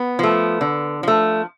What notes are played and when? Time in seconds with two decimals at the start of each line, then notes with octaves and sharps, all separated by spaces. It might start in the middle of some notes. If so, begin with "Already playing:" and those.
Already playing: B3
0.19 F3 A3
0.61 D3
1.03 F3 A3